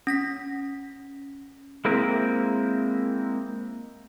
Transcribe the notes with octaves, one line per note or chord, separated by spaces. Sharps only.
C#4 A#6 B6
G#3 A#3 C4 E4 A#4